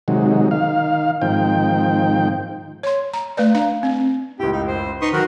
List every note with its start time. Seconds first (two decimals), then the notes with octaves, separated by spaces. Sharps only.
0.08 C3 D#3 F#3 G#3
0.51 D#3 F5
1.22 G#2 D#3 F3 C4 G5
2.83 C#5 C6
3.13 A#5
3.37 A3 B4 D5
3.55 D4 F5 A#5
3.83 C4
4.39 C#2 A2 G4
4.53 F#2 D#4
4.67 C5
5.01 D#4 B4 C6 C#6 D#6
5.13 D#3 F#3 F#4 A#4 F#5